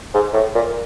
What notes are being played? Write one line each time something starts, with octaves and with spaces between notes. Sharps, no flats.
G#2
A2
A#2